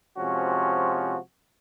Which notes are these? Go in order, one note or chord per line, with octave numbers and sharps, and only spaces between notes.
C3 F3 G#3 C#4 F#4